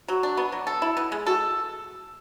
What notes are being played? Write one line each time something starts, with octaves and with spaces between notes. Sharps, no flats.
F#3 F#4
D4
B3
F#3
A4
E4
B3
G#3
F#4 A4